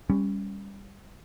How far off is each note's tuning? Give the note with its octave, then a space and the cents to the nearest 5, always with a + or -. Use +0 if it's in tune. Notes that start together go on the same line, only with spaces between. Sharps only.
G3 +20 C#4 +0